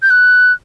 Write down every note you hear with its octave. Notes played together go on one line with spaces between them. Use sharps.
G6
F#6